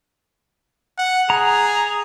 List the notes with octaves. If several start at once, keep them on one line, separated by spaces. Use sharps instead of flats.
F#5
G#4 A#5